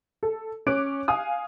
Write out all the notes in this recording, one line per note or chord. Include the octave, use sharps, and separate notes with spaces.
A4
C#4 D6 F#6 D7
F5 G#5 D#6